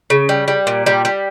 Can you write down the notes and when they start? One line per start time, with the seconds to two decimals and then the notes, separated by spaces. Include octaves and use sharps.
0.10 C#3
0.29 G3
0.48 G3
0.67 A#2
0.86 G3
1.05 G3